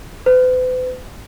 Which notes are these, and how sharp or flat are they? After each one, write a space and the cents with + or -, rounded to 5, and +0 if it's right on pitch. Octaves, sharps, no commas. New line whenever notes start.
B4 +45